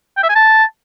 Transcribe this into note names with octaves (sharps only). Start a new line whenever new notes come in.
G5
E5
G#5
A5